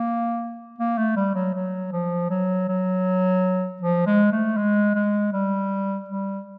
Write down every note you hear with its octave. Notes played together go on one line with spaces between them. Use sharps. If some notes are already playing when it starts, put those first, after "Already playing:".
Already playing: A#3
A#3
A3
G3
F#3
F#3
F3
F#3
F#3
F3
G#3
A3
G#3
G#3
G3
G3